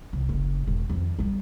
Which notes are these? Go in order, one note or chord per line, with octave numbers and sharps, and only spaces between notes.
C2
F#1
E1
F2 D#3
F#3 G3